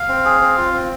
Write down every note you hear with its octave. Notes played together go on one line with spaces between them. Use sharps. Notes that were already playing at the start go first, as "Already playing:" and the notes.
Already playing: F5
C4
G#4
C4
F4
C4